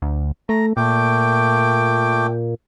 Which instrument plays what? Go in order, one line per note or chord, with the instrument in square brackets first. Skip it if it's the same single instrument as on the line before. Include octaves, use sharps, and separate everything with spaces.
[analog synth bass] D2
[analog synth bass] A3 [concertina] A#5
[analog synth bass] A#2 [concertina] A3 G5 D6